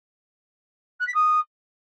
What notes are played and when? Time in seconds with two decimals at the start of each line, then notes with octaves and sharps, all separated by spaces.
1.00 F#6
1.07 B6
1.14 D#6